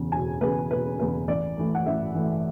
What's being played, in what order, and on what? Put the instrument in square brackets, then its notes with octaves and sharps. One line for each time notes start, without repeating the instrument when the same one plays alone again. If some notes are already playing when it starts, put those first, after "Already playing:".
Already playing: [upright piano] E1 E2 C#3
E1 G#5
E2 C#3 B4
E1 B4
E2 C#3 B4
A1 D5
A2 E3 A3
F#5
A1 E5
A2 E3 A3